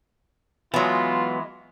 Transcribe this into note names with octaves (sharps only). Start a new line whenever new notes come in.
E3 F#3 G#3 B3 F4